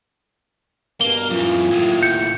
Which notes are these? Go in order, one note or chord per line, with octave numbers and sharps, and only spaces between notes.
G2 B2 A#3 G7
F#2 E3 F4
D#2 A2
G6 C#7